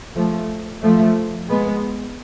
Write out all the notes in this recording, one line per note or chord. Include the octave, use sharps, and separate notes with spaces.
F3 A3
F3 A3
G#3 B3